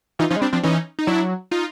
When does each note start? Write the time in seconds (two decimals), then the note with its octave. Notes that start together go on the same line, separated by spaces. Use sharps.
0.19 E3 D#4 F4
0.30 F3 C#4 D#4
0.36 G#3
0.41 G3 C4 D4
0.53 F3 C4 D4
0.63 E3 C#4 D#4
0.99 D#4
1.07 F#3 D4 E4
1.51 D#4 F4